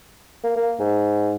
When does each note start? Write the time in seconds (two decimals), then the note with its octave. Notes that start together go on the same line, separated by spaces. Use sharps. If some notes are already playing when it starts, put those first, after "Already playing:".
0.44 A#3
0.56 A#3
0.79 G#2